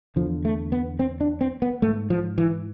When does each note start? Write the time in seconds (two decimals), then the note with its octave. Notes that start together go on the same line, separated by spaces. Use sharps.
0.16 E2 D3 F3
0.45 A3
0.72 B3
0.99 C4
1.21 D4
1.41 C4
1.62 B3
1.82 G#2 A3
2.10 F3
2.38 E3